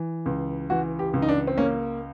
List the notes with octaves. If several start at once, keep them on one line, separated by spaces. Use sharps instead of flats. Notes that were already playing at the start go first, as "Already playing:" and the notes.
Already playing: E3
C#2
E3 F#4
G4
C#2
D#4
D4
C4
A#3 C#4